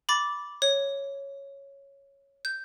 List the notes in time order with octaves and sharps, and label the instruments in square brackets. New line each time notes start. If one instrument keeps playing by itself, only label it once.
[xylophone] B5 D6 A6
C#5
G6